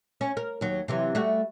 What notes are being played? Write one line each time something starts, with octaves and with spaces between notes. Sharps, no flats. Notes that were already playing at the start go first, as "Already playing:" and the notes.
C#4
A#4
D#2 F#3
C3 E3 F#3
G3 A3 F#4